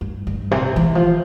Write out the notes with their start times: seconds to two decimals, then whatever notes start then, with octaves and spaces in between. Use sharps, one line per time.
0.01 G2
0.27 G2
0.51 C3
0.76 E3
0.95 F3